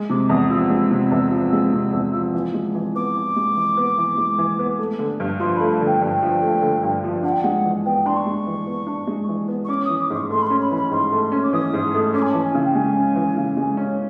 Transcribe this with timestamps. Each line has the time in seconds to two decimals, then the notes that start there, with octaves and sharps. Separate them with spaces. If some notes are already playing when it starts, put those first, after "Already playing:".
Already playing: G#3
0.10 C3 D6
0.29 E2 D#6
0.50 F3 E6
0.70 G#3
0.91 C3
1.12 E2
1.31 F3
1.53 G#3
1.73 C3
1.93 E2
2.13 F3
2.33 E3
2.54 G#3
2.75 E3
2.95 B3 D6
3.16 E3
3.36 G#3
3.57 E3
3.77 B3
3.98 E3
4.17 G#3
4.38 E3
4.59 B3
4.79 A3
4.99 D3
5.20 G2
5.40 F3 C6
5.55 A3 B5
5.71 A5
5.81 D3 G5
6.02 G2
6.22 F3
6.42 A3
6.62 D3
6.83 G2
7.04 F3
7.23 D4 F#5
7.32 G5
7.40 G#3 F#5
7.65 E3
7.85 B3 G5
8.06 D4 C6
8.16 C#6
8.26 G#3
8.47 E3
8.67 B3
8.87 D4
9.07 G#3
9.28 E3
9.48 B3
9.64 C#6
9.68 C#4 D6
9.85 E3 D#6
9.99 D6
10.10 G#2 C#6
10.30 A3 C6
10.42 B5
10.46 C#4 C6
10.61 B5
10.71 E3 B5
10.91 G#2 C6
11.12 A3
11.32 C#4
11.43 D6
11.53 E3 D#6
11.73 G#2
11.94 A3
12.14 C#4 D6
12.22 G#5
12.29 E3 A5
12.45 G#5
12.54 C#3
12.65 G5
12.75 G#3 G#5
12.96 C#4
13.16 E3
13.37 C#3
13.57 G#3
13.77 C#4